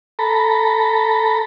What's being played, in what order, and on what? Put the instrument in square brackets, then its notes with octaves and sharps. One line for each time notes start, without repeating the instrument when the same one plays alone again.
[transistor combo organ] A4 A#5 B5